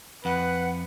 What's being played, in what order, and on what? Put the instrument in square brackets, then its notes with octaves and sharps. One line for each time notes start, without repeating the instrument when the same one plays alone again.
[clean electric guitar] F2 [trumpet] B4 [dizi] F#5